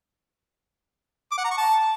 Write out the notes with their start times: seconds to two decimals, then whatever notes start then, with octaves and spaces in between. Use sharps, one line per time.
1.31 D6
1.38 F#5
1.44 A#5
1.51 C#6
1.57 A5